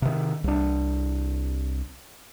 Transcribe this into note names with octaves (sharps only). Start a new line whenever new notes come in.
C3 D#3
C2 D4